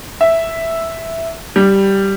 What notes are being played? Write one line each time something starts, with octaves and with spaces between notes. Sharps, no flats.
E5
G3